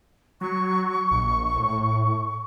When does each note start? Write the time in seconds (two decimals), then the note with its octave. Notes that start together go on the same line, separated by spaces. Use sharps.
0.41 F#3 C#6
1.11 A#1
1.56 A2